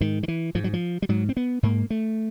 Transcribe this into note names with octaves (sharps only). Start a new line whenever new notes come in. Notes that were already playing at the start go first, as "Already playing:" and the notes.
G#2 D#3
D#3
E3
G#2 F3
F#3
F3
G3
G#2 F#3
C4
B3
G#2 A#3
A3